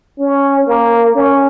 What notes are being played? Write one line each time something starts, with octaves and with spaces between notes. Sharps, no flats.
C#4
A#3
C#4